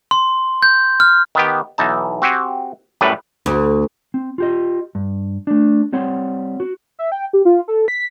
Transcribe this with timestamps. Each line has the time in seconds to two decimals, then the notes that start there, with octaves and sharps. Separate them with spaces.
0.11 C6
0.63 G6
1.00 F6
1.35 D#3 B3 G4
1.78 B1 E3 D#4 A5
2.22 C4 F#4 G4 G#5
3.01 F#2 A2 G3 B4 D5
3.46 D2
4.14 C4
4.38 F4 G4 D#5
4.95 G2
5.47 A3 D4
5.93 G3 C4 C#5 F#5
6.60 F#4
6.99 E5
7.12 G5
7.33 G4
7.45 F4
7.68 A4
7.88 B6